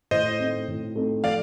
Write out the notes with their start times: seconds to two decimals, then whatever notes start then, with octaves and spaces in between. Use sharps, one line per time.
0.11 A2 C5 D#5
0.39 A3 C4 D#4 A4
0.68 A2
0.96 A3 C4 D#4 A4
1.24 F3 D5 F5